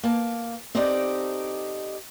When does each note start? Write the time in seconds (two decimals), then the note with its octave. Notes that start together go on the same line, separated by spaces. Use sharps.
0.03 A#3 A5
0.75 C4 D#4 G4 A4 D5 D#5